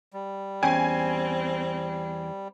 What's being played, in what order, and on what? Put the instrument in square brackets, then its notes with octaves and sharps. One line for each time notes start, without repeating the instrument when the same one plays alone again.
[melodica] G3
[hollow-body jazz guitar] E2 C#4 G5 [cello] C4 [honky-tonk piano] G#5